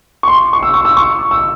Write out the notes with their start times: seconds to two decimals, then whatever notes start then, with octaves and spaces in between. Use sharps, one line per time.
0.23 C#6
0.28 C6
0.53 C#6
0.63 E6
0.74 C#6
0.85 E6
0.97 C#6
1.31 E6